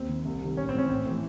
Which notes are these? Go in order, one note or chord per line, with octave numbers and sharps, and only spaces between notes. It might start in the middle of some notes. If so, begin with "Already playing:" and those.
Already playing: D#2 C4
D#3
C2
C3 D#3
A1 C#4
C4
G#2 E3 C#4
A1 C4
A2 E3